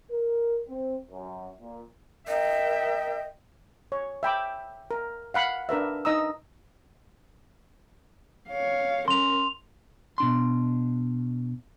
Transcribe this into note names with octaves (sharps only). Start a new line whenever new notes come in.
A#4
C4
F#2
A#2
A#4 D#5 E5 G5
C#5
E5 G5 B5 D6
A#4
F5 F#5 B5
D4 A#4 B4 E5
D#4 D#5 A#5 D#6 E6
C#5 F5
C#4 A#4 C6 F7
B2 D4 C6